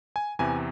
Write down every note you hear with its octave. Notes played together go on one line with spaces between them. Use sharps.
G#5
E2 C3 E3 G#5